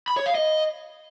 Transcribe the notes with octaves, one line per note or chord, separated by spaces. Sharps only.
B5
C#5
F5
D#5